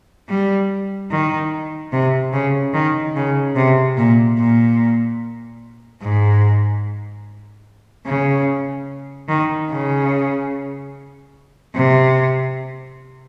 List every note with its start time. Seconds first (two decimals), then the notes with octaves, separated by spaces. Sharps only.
0.29 G3
1.11 D#3
1.92 C3
2.32 C#3
2.73 D#3
3.15 C#3
3.55 C3
3.97 A#2
4.38 A#2
6.01 G#2
8.06 C#3
9.28 D#3
9.70 C#3
11.74 C3